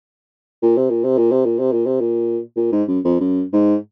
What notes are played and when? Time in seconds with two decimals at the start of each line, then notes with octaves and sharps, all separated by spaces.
0.62 A#2
0.77 C3
0.90 A#2
1.04 C3
1.17 A#2
1.31 C3
1.45 A#2
1.59 C3
1.72 A#2
1.86 C3
2.00 A#2
2.56 A#2
2.72 G#2
2.88 F#2
3.04 F2
3.20 F#2
3.53 G#2